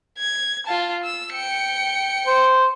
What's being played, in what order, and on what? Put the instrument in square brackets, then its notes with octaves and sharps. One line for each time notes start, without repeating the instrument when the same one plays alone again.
[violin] G#6
F4 A5
E6
G5 C#7
[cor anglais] C5